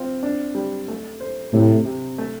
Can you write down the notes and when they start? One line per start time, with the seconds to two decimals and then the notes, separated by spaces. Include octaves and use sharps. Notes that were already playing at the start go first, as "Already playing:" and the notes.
Already playing: C4 F4
0.23 D4
0.55 G3
0.88 A3
1.20 C5
1.53 A2 C3
1.85 C3
2.18 A3